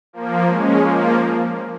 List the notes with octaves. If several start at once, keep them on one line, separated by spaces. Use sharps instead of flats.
F3 A#3
G#3 C#4
F3 A#3